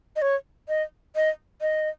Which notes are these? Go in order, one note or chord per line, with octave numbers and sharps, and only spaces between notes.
D#5
C#5
D#5
D#5
D#5